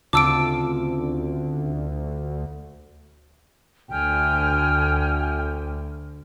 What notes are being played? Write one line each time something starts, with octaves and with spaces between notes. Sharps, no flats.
D2 C#3 C4 F4 A5 D6 E6 D7
D2 G5 G#5 F6